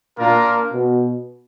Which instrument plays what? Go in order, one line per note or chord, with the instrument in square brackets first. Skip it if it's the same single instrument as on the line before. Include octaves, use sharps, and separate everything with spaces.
[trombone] A#2 [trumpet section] A#3 D4 F4 A#4
[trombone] B2